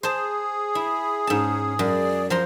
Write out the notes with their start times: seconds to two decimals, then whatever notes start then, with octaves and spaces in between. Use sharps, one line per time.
0.03 G#4 C5 A5
0.75 E4 B5
1.27 G#2 C#4 A5
1.79 F#2 D5
2.30 F3 C5 A#5 C6